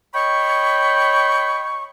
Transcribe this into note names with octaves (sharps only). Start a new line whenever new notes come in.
C#5 D#5 G5 B5 C#6